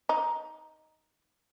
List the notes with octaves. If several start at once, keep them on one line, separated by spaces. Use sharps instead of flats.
D#4